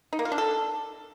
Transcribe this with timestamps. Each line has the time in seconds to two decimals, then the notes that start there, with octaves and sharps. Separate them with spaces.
0.13 D#4
0.19 A#3
0.25 F4
0.32 D4
0.38 A4